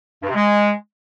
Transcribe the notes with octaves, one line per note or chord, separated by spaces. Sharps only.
G2
C3
G#3